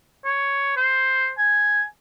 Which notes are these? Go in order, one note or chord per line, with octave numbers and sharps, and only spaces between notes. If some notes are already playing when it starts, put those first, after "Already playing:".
C#5
C5
G#5